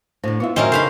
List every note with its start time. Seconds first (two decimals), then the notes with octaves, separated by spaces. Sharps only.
0.24 A2 D3 C5
0.40 B3 E4 F4 E5
0.56 F#2 A2 D#3 C4 C#4 A#4 D#5 E5
0.72 C#3 D#4 A4 C5 F5 B5